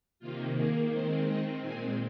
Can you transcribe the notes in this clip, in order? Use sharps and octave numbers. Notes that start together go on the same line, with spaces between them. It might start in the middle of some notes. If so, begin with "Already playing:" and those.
C3 D#3 A#3 F4
D#3 A#3 G#4
D#3 G#3 C4 C5
D#3 C4 D#5
A#2 G#3 C4 G#5